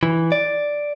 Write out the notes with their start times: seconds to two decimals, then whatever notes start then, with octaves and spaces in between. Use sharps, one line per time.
0.03 E3
0.32 D5